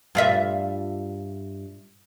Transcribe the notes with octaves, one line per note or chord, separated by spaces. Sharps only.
G2 F4 E5